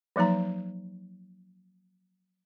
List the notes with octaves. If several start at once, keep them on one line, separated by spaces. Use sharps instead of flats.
F3 F#3 A#3 D#4 A#5